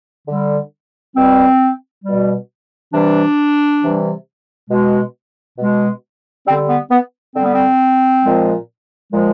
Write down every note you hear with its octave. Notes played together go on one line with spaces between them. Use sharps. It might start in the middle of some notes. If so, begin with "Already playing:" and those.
D3 G3
B2 G3 C4
B2 G3
C3 E3 G3 D4
C3 E3 G3
B2 G#3
B2 G#3
D3 G3 C4
B3
B3
D3 G3 C4
B3
C4
A#2 F3 G#3
A#2 F3 G#3